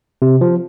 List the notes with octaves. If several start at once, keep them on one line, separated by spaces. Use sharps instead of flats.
C3
F3